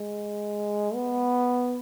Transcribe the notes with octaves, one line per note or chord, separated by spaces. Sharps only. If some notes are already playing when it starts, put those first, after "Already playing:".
Already playing: G#3
B3